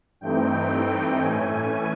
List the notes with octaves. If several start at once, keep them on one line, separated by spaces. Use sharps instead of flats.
G2 E3 A3 C4 D#4 G5
A2 E3 A3 C#4 G#5